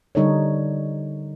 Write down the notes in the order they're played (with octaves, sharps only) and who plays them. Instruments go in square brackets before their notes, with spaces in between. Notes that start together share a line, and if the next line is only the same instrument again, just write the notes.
[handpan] D3 G3 D#4 A4 A#4 C#5